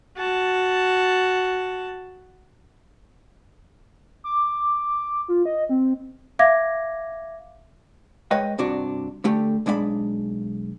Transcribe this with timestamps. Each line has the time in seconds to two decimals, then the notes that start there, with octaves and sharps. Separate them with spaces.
0.16 F#4 A5
4.24 D6
5.28 F4
5.46 D#5
5.69 C4
6.39 E5 F5 D6 G#6 A#6
8.31 G#3 B4 C#5 D#5 G5
8.58 G2 C3 D4 F#4
9.24 D3 A3 G4
9.66 B1 G#3 D4 E5 B5